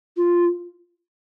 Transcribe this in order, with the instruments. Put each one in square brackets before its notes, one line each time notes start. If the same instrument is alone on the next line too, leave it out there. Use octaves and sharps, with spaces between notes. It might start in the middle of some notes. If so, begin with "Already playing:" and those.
[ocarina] F4